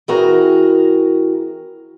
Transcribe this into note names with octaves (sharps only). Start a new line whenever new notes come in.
E3 C4 F#4 G#4 A#4